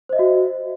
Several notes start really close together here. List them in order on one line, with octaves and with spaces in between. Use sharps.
C5 D#5 E5 F#4